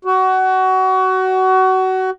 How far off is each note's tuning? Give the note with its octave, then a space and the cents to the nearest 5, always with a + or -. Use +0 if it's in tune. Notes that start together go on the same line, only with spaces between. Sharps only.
F#4 +25